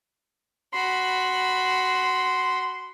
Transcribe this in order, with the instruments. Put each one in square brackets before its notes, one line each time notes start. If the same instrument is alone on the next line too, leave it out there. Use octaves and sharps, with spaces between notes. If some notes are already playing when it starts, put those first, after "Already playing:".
[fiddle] F#4 B5 [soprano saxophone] C6